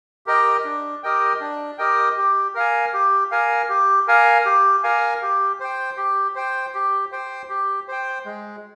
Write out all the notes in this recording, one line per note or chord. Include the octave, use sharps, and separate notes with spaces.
G4 A#4 D#5 G5
D4
G4 A#4 D#5 G5
D4
G4 A#4 D#5 G5
G4
A#4 F5 G#5
G4
A#4 F5 G#5
G4
A#4 F5 G#5
G4
A#4 F5 G#5
G4
C5 G5
G4
C5 G5
G4
C5 G5
G4
C5 G5
G#3